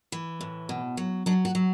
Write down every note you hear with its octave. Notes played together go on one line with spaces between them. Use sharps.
E3
A2
B2
F#3
F#3 D4
F#4
F#3